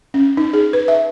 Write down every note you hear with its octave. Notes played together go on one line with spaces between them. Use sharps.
C#4
D#4
G#4
B4
E5